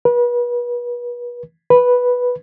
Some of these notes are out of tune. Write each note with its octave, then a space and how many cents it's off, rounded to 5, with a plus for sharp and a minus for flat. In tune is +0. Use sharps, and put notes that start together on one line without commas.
B4 -35
B4 -5